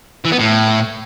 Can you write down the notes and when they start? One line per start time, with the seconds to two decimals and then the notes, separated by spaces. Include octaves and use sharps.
0.25 E3
0.32 B3
0.39 A2